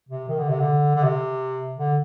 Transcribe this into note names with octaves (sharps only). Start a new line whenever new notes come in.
C3
D#3
D3
C3
D3
D3
C3
D3